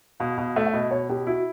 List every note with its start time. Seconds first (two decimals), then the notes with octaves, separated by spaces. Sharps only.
0.20 B2 F5
0.38 B2 F5
0.56 A3 E5
0.67 E5
0.73 B2 D#5
0.91 B2 C#5
1.09 B2 G4
1.27 E4 F#4